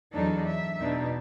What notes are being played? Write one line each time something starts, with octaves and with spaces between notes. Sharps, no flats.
E2 F#3 D4 D#4 A4
E5
E2 B2 D4 D#4